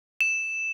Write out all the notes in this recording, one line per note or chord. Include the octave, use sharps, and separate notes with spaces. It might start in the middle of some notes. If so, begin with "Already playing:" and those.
E7